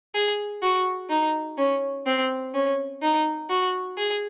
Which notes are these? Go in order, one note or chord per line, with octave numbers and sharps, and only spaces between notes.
G#4
F#4
D#4
C#4
C4
C#4
D#4
F#4
G#4